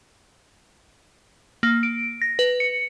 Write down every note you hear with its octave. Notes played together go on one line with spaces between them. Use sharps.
A#3
D7
A#6
B4
C#7